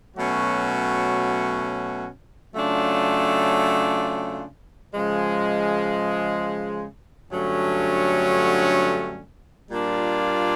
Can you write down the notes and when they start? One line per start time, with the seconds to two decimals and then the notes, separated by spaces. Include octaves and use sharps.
0.16 B2 F#3 A3 C#4 F#4
2.55 C#3 F#3 A3 D4 F4
4.94 C#3 F3 G#3
7.30 G2 D3 F#3 A3 C#4
9.69 A#2 G3 A#3 D4 F4